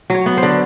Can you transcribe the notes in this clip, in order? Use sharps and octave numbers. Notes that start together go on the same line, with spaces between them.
F#3 C#5
B3
C5
D3